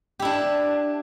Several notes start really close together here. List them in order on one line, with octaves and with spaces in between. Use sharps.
G4 E4 D4